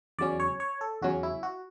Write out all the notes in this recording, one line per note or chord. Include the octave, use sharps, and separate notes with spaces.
E2 C#3 F#3 C#4 D5
C#5
C#5
A4
E2 C#3 F#3 C#4 F#4
E4
F#4